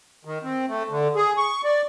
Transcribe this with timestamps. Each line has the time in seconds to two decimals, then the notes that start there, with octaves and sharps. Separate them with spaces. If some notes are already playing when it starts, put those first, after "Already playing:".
0.25 D#3
0.43 C4
0.68 A3
0.90 D3
1.16 G#4
1.38 C#6
1.64 D5